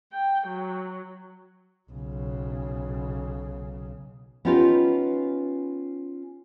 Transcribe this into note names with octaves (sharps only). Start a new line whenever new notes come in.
G5
F#3
B1 C#3
B3 C#4 D#4 F4 G4 B4